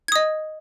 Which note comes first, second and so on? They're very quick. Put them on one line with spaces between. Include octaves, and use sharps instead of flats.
G#6 D#6 D#5